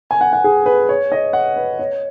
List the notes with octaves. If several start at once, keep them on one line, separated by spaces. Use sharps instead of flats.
G#5
F#5
F#5
G#4
B4
C#5
D#5
F#5
B4
C#5